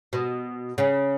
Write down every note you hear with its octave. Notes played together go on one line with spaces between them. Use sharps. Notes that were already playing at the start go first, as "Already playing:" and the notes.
B2
C#3